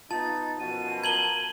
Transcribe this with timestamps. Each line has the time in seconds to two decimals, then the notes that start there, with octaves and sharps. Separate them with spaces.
0.11 B3 D#4 F4 A5 A6
0.59 F#2 B2 F3 D#7
1.04 A#4 A5 A#5 G#6 F#7 G7